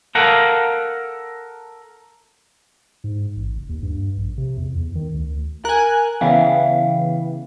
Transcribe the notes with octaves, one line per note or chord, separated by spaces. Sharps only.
A4 A#4 F5 F#5
G#2
A1
F#1
D#2
G2
A#1
C3
E2
E2
D#3
D2
A#4 G#5 F#6
C#3 E3 B3 E5 F5 G5